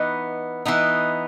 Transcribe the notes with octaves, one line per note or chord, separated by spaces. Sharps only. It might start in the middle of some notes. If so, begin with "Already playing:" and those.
Already playing: E3 B3 D#4 B4 D#5
E3 B3 D#4